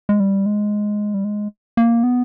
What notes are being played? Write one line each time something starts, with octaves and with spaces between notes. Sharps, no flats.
G#3
G3
G#3
G3
G#3
A#3
B3